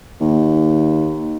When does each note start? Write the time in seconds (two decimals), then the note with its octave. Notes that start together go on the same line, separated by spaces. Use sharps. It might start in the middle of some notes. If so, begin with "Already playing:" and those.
0.20 D#2